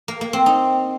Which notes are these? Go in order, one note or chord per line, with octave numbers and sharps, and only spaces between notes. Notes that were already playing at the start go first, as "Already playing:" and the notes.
A#3
A#3
C4
D#4